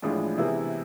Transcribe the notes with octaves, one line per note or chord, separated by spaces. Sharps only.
A1 A2 F3 G#3 D4
C3 E3 B3 E4 G#4